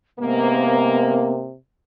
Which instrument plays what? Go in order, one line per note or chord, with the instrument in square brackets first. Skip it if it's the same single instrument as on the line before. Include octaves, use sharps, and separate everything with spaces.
[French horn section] G#2 A#3 [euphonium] C3 [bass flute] B3